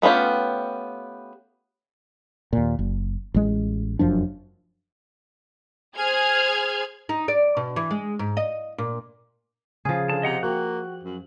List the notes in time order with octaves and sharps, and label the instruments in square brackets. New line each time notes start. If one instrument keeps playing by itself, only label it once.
[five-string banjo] A3 B3 C#4 F4 G4
[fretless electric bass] D#2 A#2
F#1
A1 G#3
F1 F#2 F3 D4
[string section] G#4 C5 F6 G#6
[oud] D#4
D5
B2
E3
G#3
G#2
D#5
A#2
[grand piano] C#3 [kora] F3 G#4
[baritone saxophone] D3 [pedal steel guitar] A5
[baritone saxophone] C3 [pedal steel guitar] D#5 F#5 A#5
[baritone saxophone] A#3 [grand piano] F#4 G5 [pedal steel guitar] F#6
[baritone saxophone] F#2